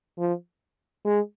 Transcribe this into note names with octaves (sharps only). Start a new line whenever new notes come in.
F3
G#3